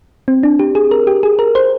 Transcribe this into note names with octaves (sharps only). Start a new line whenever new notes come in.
C4
D4
G4
G#4
A#4
G4
G#4
A#4
C5